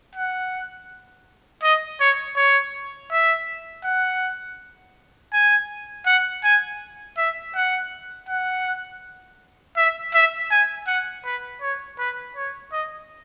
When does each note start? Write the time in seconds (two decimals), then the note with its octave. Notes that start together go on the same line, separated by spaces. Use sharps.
0.15 F#5
1.63 D#5
2.00 C#5
2.36 C#5
3.11 E5
3.84 F#5
5.33 G#5
6.06 F#5
6.44 G#5
7.18 E5
7.55 F#5
8.29 F#5
9.77 E5
10.14 E5
10.51 G#5
10.87 F#5
11.25 B4
11.62 C#5
11.98 B4
12.36 C#5
12.72 D#5